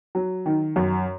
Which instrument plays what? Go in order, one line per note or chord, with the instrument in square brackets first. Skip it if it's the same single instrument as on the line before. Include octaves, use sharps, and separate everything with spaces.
[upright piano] F#3
D#3
F#2